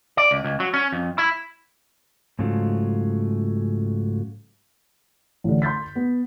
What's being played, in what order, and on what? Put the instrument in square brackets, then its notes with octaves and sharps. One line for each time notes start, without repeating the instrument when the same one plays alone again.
[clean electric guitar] D5
C#2
C#2
F#3
C#4
F2
E4
[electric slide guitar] G#2 C#3 F#3 A3 F4
[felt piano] A1 D3
C6 G6 A6 B6
B3